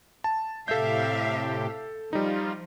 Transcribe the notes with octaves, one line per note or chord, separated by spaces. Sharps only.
A5
A2 C3 G4 A4 E5 F5 G6
F3 G3 D#4 F4